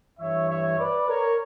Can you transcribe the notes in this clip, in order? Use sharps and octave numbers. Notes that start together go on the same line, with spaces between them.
G2 E3 C#5 E5
C#5 E5
B4 D5
A#4 C#5